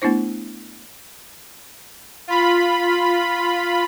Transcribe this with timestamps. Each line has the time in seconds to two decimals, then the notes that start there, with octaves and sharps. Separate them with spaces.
0.02 A3 B3 D4 E4 C5
2.28 F4 B5